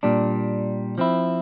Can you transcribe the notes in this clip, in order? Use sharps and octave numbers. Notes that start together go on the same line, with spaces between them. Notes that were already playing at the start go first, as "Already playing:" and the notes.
A#2 G3 D4
F3 C4 E4